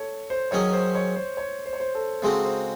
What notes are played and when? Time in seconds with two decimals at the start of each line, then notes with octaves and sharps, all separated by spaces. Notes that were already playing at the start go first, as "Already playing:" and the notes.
Already playing: A4 C#5
0.30 C5
0.51 D#3 F#3 C#4 G#4 C#5 D#5
0.73 C5
0.95 C#5
1.16 C5
1.37 C#5
1.66 C5
1.73 C#5
1.80 C5
1.95 A4
2.22 C#3 G#3 C4 D#4 F#4 A4
2.45 C5